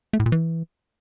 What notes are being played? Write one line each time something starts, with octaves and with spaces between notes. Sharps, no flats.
A3
A2
A#2
E3